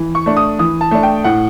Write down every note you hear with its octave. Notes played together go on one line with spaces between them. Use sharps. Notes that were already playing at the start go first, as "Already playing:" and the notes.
Already playing: E3
C#6
A3 D4
D#6
E3 D#6
A5
A3 D4
G5
A2 F#5